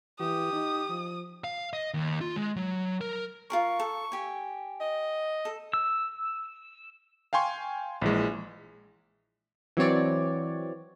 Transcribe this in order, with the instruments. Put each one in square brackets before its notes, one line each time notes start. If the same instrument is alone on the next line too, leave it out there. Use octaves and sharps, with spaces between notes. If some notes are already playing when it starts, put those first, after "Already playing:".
[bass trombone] E3 [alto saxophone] G4 [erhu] D#6
[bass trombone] D#4
F3
[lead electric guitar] F5
D#5
D#2
F4
G#3
F#3
A#4
[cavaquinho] F4 G#4 A#4 [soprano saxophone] C#6
[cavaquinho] A4
G4 G#5
[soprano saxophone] D#5
[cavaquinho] A4
[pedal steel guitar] E6
[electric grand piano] F5 G5 G#5 C6 C#6
A#1 E3 G#3
[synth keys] E3 F#3 C4 C#5 D5